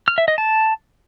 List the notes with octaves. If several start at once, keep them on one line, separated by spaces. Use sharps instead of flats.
F6
E5
D#5
A5